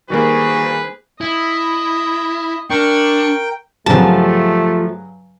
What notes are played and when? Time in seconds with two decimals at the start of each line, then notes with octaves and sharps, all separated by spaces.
0.10 D#3 G3 A#3 F#4 G#4 B4 C5
1.21 E4 D#5
2.70 D4 A#4 G5 C#6
3.86 G2 C#3 F3 F#3 A3 G4 A5